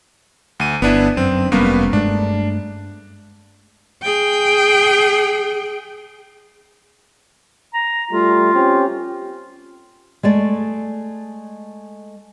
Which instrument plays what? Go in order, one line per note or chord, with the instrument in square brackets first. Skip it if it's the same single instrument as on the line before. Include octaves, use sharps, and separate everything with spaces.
[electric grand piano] D2 D#7
[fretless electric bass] G1 [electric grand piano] B3 D4 E4
[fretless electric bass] F#2 [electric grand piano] C4
[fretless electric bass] F1 G3 C#4 [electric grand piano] G2 A#3 B3
[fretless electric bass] G2 G#3 A3 [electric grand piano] D4
[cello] G#4 G5
[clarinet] A#5
[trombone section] G3 A3 [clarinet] F4
[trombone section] C4 C#4 G4
[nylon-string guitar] G#3 A3 D5